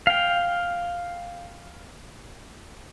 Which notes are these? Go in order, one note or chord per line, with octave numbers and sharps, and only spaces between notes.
F5 G5